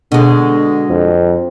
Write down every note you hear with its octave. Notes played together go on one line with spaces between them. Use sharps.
B2 D3 G#3
F2